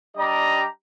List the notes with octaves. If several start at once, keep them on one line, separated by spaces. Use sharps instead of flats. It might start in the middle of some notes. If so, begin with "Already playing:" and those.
G3 D4 G4 D5 D#5 A#5